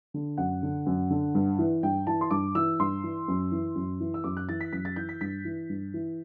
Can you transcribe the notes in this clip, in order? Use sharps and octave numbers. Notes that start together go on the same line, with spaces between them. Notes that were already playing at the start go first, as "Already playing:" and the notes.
D3
F#2 F#5
D3
F#2
D3
G2
E3
G2 G5
E3 A5
C6
G2 D6
E3 E6
G2 C6
E3
F#2
E3
F#2
E3
E6
F#2 D6
F#6
E3 A6
B6
F#2 B6
A6
E3 G6
B6
G2 B6
E3
G2
E3